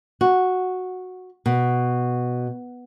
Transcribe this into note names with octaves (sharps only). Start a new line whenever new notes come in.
F#4
B2